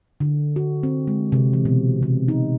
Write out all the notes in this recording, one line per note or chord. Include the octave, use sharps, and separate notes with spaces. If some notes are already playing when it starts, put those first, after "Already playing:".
D3
F#4
C4
G#3
C3
E3
B2
C3
D#4